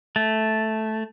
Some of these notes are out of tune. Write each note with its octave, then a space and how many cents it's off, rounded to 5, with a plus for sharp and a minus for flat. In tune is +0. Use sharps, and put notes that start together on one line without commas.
A3 -5